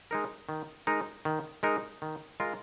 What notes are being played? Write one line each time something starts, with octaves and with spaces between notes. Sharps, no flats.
G#3 D#4 A#4
D#3
G#3 D#4 A#4
D#3
G#3 D#4 A#4
D#3
G#3 F4 A#4